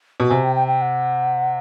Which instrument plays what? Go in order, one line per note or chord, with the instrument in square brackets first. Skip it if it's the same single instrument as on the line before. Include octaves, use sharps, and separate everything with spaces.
[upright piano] B2
[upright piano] C3 [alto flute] G#5
[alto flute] G5
G5
G5
F#5